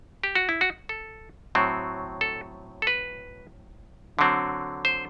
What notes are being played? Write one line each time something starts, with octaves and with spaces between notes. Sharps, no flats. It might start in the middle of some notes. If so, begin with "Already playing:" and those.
G4
F#4
E4
F#4
A4
A2 F#3 C4
A4
A4
B4
D3 F#3 C4
C5